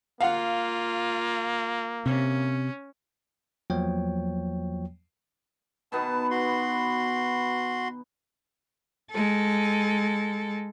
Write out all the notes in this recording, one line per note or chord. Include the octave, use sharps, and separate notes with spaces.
A#3 F4 F5 F#5
C3 C#4
E2 F3 F#3 A#3 C#5 G5
B2 D#3 B3 A5
F#4 C6
G#3 A4